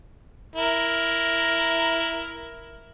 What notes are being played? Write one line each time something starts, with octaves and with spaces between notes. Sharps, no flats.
E4 A#4